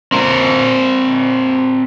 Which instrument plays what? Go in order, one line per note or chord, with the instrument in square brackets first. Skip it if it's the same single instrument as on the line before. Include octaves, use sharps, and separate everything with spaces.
[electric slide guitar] C4 A#4